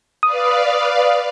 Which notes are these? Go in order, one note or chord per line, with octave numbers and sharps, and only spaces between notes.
B4 D5 F5 D#6